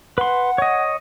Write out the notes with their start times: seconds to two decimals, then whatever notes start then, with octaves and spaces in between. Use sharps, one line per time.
0.18 B4 F#5 C6
0.58 C#5 D#5